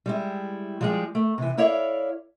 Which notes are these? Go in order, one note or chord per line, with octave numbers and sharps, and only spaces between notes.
G3 G#3 E4
F3 G3 G#3 G4 G#4
A3
C3 E3
E4 A4 C#5 D5 E5 F5